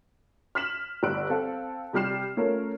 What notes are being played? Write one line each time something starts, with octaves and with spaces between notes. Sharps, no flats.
F6 B6 E7 F#7
G1 G2 E6 F#6 D7
C4 A4 F5
C3 G3 G4 F6 C7 E7
A3 C#4 F4 A#4